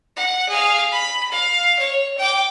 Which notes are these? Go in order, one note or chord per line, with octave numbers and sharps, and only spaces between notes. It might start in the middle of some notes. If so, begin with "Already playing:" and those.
F#5
G#4 F5
B5
F5
C#5
G5 D6